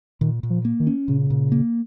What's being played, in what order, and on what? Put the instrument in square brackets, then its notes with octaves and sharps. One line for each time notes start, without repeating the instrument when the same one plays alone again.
[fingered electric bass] A#2 [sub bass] D#3
[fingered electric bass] A#2
[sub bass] F3
[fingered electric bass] A#3
[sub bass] D#3
[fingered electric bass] C#4
[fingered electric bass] A#2 [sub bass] C#3
[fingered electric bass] A#2
A#3